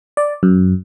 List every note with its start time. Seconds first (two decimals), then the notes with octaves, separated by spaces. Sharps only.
0.17 D5
0.43 F#2